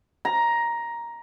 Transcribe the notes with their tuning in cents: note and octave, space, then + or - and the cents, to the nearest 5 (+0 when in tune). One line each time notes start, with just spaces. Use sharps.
A#5 +10